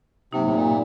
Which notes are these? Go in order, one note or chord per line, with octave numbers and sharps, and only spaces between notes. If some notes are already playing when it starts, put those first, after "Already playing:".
G2 C3 F#3 A#3 D#4
A2
A#2